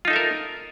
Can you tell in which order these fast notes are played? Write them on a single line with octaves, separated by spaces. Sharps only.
F4 D#4 A4 E5 A#4